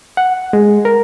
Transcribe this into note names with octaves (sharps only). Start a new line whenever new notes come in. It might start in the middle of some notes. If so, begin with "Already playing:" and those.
F#5
G#3
A#4